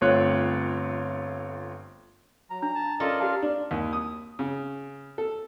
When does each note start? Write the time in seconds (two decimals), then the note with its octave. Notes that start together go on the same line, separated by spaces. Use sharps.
0.01 G1 A3 C4 F4 C#5 F#6
2.50 F#3 A#5
2.62 D4 A#5
2.75 A5
3.00 C#4 F4 A4 A#4 D5 D#5
3.20 G4 F5 A5
3.42 D4
3.71 D#2
3.93 D#6
4.39 C#3
5.18 A4